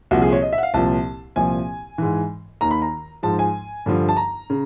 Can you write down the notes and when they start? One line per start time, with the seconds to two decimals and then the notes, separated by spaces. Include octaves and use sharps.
0.11 C2 A#2 F3 F#4
0.22 G#4
0.32 C#5
0.42 D#5
0.53 E5
0.58 F#5
0.63 F5
0.74 C2 A#2 F3 A5
1.36 C2 A#2 F3 G#5
1.98 G#2 E3
2.61 D#2 D#3 A#5
2.71 B5
2.82 A#5
3.23 G#2 F3 A5
3.39 G#5
3.86 G2 D3 F3
4.08 A5
4.17 A#5
4.50 C#3